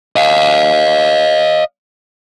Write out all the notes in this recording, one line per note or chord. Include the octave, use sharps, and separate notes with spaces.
D#5 F5